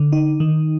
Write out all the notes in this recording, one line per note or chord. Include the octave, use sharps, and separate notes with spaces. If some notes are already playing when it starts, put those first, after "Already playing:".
Already playing: D3
D#4
D#3